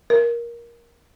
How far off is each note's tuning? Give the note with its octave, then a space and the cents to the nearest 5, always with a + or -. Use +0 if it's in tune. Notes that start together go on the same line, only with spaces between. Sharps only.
A#4 +15